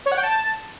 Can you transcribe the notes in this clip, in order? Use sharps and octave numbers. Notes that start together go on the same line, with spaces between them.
C#5
F#5
G5
A5